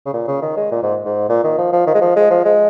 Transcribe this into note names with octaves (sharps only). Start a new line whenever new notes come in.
C#3
A#2
C#3
D#3
G#3
A#2
G#2
G#2
A#2
D#3
F3
F3
D#3
G#3
F3
G#3
F3
G#3